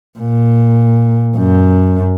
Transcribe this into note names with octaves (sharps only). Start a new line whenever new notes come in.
A#2
F#2